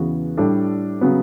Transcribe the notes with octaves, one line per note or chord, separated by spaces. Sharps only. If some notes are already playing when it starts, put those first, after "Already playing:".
Already playing: E2 C#3 E3 B3 F#4
A2 G3 D4 A4
C#3 F#3 B3